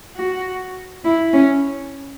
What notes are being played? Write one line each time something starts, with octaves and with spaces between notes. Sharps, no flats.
F#4
E4
C#4